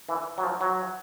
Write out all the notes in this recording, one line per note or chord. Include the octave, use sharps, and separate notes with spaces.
E3
F#3
F3
F#3